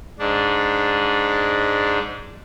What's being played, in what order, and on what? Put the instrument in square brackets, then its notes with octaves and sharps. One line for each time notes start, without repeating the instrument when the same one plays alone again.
[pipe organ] G#2 D4